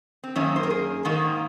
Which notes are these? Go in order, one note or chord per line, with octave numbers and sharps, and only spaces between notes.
C4
F#2 D#3 A#3 C#4
C5
A#4
G#4
G#2 D#3 A#3